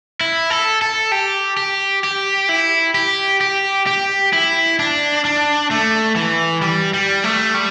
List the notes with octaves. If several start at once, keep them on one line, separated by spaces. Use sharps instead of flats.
E4
A4
A4
G4
G4
G4
E4
G4
G4
G4
E4
D4
D4
A3
E3
G3
G3
A3
G3